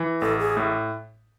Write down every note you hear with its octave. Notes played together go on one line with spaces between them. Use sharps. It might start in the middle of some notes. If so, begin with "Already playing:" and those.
Already playing: E3
A1 A4
G#4
A2